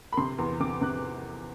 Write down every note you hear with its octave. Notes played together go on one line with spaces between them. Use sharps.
B5
C3 C6
E2
C3 D6
C3 F#6